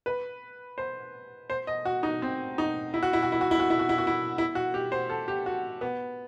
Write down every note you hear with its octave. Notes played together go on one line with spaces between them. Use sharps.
B4
C5
C5
D#5
F#4
D#4
C4
D#4
E4
F#4
E4
F#4
E4
F#4
E4
F#4
E4
F#4
E4
F#4
E4
E4
F#4
G4
C5
A4
G4
F#4
B3